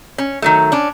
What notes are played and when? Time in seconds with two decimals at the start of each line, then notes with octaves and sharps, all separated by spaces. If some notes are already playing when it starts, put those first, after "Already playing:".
0.18 C#4
0.42 D#3 F#3 A3
0.72 C#4 D4